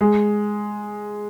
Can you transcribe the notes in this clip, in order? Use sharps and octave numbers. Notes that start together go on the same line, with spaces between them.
G#3